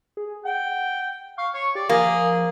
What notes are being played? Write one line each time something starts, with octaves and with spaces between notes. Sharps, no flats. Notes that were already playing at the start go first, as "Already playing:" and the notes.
G#4
F#5 G5
F5 C#6
C#5
G4 D5
F3 A#3 G#4